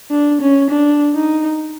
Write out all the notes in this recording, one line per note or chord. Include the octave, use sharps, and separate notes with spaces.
D4
C#4
D4
D#4